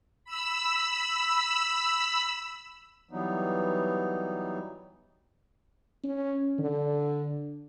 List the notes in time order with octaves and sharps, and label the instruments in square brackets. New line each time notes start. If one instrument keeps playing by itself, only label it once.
[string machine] B5 E6
[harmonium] E3 F#3 G3 B3 D#4
[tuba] C#4
D3